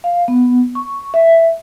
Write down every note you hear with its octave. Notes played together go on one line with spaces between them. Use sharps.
F5
B3
C#6
E5